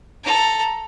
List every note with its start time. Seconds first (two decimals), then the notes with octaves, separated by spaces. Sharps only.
0.24 A4 A#5